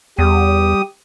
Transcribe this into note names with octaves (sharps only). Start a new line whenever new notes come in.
E2 G3 G4 D#6